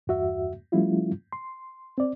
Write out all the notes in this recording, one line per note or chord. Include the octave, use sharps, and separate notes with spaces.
E2 G2 F#4 E5
F3 G3 A3 C#4 E4 F4
C6
C4 D5